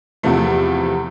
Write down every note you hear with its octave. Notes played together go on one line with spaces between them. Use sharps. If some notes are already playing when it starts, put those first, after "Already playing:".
E2 C3 F3 A3